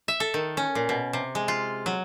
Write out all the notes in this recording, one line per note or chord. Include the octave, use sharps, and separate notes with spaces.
E5
A4
D#3
C#4
A#2
B2
C3
G#3
F4
F#3